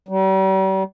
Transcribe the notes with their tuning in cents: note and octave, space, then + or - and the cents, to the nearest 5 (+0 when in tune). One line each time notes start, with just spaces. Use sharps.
G3 -40